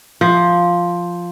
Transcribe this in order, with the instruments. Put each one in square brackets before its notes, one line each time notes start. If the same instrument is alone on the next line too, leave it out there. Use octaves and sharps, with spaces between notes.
[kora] F3